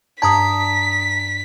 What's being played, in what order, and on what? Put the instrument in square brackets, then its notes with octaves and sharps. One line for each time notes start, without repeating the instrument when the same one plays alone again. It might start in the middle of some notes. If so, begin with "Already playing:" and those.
[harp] G2 D5 G#6 [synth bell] A5 A#5 D#6 [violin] B6